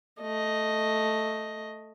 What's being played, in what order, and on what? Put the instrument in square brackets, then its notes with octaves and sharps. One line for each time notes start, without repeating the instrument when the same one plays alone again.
[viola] A3 D#5